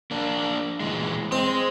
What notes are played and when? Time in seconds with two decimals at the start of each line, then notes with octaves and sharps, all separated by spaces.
0.11 A#3 D4
0.80 A#2 E3 G#3
1.32 G#3 C4